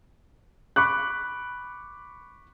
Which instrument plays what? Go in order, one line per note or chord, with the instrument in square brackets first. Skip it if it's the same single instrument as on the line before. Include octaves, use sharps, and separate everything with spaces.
[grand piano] B5 C#6 D6 F#6